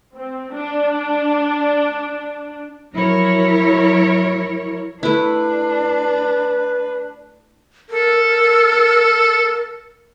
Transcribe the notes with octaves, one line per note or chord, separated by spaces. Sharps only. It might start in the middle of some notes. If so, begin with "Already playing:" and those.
C4
D4
F3 F#3 E4 A#4 C#5
A3 D4 E4 B4
A4 A#4